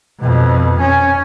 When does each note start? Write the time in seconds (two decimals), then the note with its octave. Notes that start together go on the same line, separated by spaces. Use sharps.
0.20 F2 B2
0.80 C#4